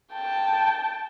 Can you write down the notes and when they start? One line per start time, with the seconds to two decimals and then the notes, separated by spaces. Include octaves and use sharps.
0.13 G5 A5